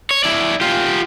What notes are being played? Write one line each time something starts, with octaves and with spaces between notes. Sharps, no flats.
C#5
E4 D5
F4 G4